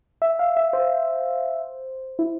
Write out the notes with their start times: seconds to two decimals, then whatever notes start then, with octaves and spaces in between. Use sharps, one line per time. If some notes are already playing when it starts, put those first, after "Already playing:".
0.22 E5
0.39 F5
0.57 E5
0.73 C5
2.19 E4